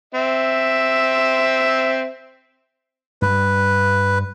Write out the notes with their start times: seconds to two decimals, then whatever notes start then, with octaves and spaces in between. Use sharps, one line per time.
0.15 C4 E5
3.22 G2 G3 B4